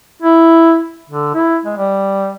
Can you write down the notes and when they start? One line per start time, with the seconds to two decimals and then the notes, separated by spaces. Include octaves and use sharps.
0.23 E4
1.10 D3
1.34 E4
1.66 G#3
1.77 G3